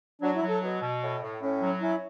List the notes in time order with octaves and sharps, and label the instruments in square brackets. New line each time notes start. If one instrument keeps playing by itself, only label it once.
[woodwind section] F#3 [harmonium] D4
[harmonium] E4
[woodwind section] F#3
[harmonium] A4
[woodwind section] B2
B2
A2
A2
[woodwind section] A2 [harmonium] C#4
[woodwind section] F#3
[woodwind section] C#4 [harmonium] E4